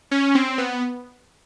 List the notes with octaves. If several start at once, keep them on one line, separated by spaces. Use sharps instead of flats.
C#4
C4
B3